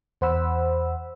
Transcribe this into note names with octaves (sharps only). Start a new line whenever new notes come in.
E2 C5 F#5 B5 E6